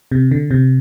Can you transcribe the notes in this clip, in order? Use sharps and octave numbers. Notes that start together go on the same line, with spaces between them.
C3
D3
C3